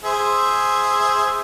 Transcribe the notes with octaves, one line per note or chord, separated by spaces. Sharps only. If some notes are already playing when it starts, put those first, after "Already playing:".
G#4 C5 E5